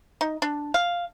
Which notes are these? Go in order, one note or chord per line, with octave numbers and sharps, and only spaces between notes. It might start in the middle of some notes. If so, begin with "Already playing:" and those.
D#4
D4
F5